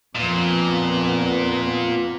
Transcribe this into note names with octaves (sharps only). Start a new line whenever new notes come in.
F2 A#2 B3